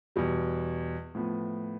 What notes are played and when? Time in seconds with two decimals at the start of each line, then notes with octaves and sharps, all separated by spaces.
0.16 E2 B2 G3
1.15 A2 F3 B3